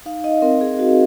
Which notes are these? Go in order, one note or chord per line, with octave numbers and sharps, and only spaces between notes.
D#4 F5
D#4 D#5
C4 A#4
C4 G#4
D#4 F#4